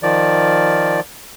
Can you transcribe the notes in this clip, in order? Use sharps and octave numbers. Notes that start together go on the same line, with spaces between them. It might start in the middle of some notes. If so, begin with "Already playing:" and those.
D#3 F3 D5